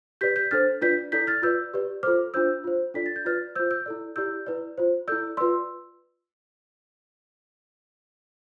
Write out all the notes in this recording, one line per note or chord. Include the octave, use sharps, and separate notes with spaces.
G4 B4 D5 G6 B6
G6 B6
D4 A4 C5 F6 A6
D4 F4 B4 D5 G6 B6
E4 A4 D5 G6 B6
F6 A6
F4 B4 D5 E6 G6
G4 B4 D5
F4 A4 C5 D6 F6
D4 F4 C5 E6 G6
F4 C5
D4 F4 A4 D5 B6
A6
G6
F4 B4 D5 F6 A6
F4 C5 E6 G6
E6 G6
E4 A4 D5
E4 G4 D5 E6 G6
E4 B4 D5
F4 C5
E4 A4 D5 E6 G6
F4 B4 D5 C6 E6